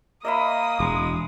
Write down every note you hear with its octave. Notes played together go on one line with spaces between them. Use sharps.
A#3 D#5 E5 B5 D#6
E1 G#3